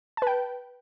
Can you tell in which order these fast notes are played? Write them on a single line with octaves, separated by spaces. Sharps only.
A5 B4 G5